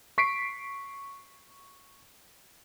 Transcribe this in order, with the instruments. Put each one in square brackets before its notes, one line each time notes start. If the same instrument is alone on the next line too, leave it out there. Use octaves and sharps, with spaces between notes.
[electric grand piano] C#6 B6 C7 D7